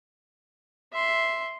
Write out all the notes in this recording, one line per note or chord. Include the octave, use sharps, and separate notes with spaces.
E5 C6